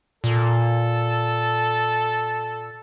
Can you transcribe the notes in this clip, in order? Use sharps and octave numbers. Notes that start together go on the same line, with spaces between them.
A#2 A4